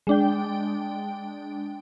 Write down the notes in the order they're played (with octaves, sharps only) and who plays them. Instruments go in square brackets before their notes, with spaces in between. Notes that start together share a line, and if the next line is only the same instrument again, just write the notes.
[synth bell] G#3 D4 G5